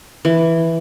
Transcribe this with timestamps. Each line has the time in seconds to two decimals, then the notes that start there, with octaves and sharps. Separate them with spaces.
0.25 E3